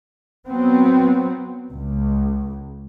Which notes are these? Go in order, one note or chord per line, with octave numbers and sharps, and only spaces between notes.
F#3 B3 C4
C#2